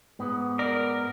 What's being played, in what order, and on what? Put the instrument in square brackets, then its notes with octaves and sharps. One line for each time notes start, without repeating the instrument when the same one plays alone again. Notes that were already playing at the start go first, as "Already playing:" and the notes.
[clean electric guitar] G#2 B3
[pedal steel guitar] A#4 [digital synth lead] D5